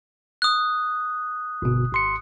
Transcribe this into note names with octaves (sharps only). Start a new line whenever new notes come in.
D#6 F#6
G1 B2
G#1 C6 C#7